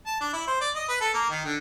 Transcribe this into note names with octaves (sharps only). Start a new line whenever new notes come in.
A5
D4
E4
C5
D5
D#5
B4
A4
A#3
D#3
D3